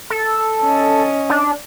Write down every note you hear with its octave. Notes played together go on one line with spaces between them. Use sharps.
A4
C#4 D#5
D4